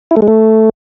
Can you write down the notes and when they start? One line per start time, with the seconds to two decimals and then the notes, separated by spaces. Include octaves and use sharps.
0.11 E4
0.17 A3
0.22 G#3
0.28 A3